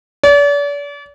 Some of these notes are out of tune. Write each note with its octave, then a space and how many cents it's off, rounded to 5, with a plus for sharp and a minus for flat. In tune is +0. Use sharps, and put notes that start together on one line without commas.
D5 -40